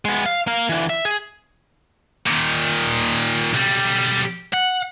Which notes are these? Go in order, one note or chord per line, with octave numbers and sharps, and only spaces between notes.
G#3 B3
F5
A#3 F5
D3 E3
E5
G#4
A#2 D#3
B1 G3
F#5